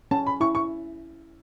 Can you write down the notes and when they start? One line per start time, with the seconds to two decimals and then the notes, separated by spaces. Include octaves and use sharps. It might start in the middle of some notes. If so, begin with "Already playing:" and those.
0.11 C#4 A5
0.27 B5
0.41 E4 C#6
0.55 C#6